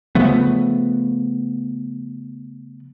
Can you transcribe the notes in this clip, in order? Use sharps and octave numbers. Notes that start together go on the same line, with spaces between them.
C#3 F3 A3 B3